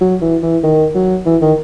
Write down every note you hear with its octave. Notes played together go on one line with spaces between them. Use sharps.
F#3
E3
E3
D#3
F#3
E3
D#3